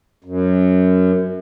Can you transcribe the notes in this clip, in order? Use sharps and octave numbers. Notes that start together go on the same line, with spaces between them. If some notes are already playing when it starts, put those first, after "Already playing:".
F#2